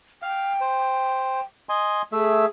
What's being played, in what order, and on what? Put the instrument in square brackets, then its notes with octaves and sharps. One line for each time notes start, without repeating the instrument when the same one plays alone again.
[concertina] F5 [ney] G5
[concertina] C5
D#5 G#5 C6
[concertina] A3 E5 [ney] G#4